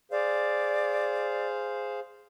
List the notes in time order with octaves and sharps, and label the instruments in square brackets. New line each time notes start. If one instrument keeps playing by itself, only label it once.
[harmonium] G#4 C5 F5 [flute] D5